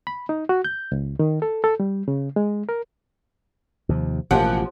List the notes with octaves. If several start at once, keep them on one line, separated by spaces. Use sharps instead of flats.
B5
D#4
F#4
G6
C#2
D#3
A4
A4
G3
C#3
G#3
A#4
D#2 C3 F3
A1 B2 F3 A#3 G4 F#5